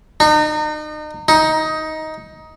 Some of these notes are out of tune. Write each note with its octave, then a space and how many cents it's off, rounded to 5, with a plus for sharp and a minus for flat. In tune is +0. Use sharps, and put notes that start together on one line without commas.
D#4 -35
D#4 +15